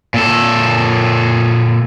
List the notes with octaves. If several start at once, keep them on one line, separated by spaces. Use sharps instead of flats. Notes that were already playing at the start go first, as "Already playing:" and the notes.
A#2 A4